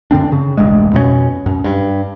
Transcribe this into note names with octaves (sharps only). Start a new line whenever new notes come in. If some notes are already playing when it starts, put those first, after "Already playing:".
F#2 D3 C4 D4
C#3
E1 A1 G2 G#3
F2 B2 B3 C#4
F#2
G2